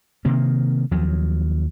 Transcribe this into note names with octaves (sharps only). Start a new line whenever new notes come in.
C3 D#3 A#3
D#2 F3 F#3